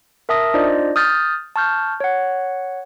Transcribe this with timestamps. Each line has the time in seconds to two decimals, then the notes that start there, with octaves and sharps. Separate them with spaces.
0.29 A#4 E5 A5 D#6 A#6
0.54 D4 D#4 F4 C5 D5 D#5
0.96 D#6 F6 G6 A6
1.56 A5 C#6 F6 G6
2.00 C#5 F#5